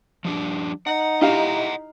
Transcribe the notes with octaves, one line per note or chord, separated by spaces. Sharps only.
F3 G3 D4
D#4 F#5
E4 G4 D#5 F5 F#5 A#5